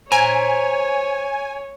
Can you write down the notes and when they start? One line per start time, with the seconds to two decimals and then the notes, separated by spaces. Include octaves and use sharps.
0.12 C5 C#5 G#5 A#5